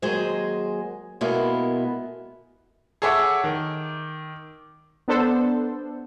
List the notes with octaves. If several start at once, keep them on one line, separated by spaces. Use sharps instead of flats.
D#2 F#3 G#3 G#4 C5
B2 G#3 A#3 B3 E4 A4
G#4 A4 C#5 E5 F#5 D6
D#3
B3 D4 A4 C5